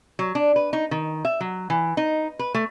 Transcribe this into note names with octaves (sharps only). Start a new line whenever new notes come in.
F#3
D4
B4
D#4
D#3
E5
F#3
E3
D#4
B4
A3